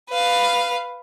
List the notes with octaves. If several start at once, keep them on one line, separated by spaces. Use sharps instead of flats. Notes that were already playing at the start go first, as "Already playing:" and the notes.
B4 F5